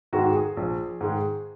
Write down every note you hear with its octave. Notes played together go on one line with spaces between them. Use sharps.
G#2 D#3 G#3 F#4
G#4
A#1
G#2 D#3 G#3